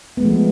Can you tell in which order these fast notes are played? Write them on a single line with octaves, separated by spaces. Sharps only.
B3 G#3 A3 F3